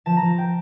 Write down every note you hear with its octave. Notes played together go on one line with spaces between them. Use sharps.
F3 A5
A#5
F3
G5